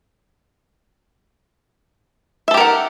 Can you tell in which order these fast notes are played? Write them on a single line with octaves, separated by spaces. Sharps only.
E5 A4 G4 A#4 F#5